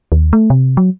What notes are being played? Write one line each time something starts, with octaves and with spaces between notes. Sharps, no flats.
D#2
A3
C3
F#3